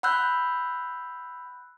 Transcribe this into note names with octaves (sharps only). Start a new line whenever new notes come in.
F#5 B5 E6 F#6 G6